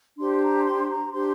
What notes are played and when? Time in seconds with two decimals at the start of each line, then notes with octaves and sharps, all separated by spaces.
0.18 D4 G4 C5 C6
0.42 A#5
0.66 C6
0.90 A#5
1.13 D4 G4 C5 C6